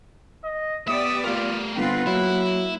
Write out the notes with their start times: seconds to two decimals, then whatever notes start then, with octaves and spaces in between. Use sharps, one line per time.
0.44 D#5
0.88 B3 G4 D5 E5 D#6
1.24 A3 F4 A#4
1.77 G1 C4 F4 B4 F#5
2.07 F#3 A#3 E4